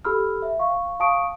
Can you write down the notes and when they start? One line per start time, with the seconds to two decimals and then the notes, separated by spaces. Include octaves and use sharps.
0.05 G4 A4 B5 E6 F6
0.42 E5
0.59 F5 C#6
1.00 F5 A5 C#6 D#6 D7